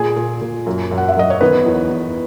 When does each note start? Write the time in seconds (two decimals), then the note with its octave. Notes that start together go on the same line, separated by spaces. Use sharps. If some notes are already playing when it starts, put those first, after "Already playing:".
Already playing: A#2 G#4 G#5
0.16 A#2
0.41 A#2
0.66 F#2
0.91 F#2
0.98 F#5
1.08 E5
1.17 F#2 D#5
1.30 C#5
1.41 D#3 B3 B4
1.66 E2
1.91 E2